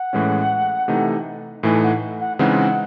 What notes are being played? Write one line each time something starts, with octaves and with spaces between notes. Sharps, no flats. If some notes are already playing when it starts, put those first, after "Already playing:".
Already playing: F#5
A2 E3 G#3 C#4
C3 E3 A3 D#4
A2 E3 A3 D#4 G#5
F#5
F#5
C#3 E3 G#3 C4 D#4 F#5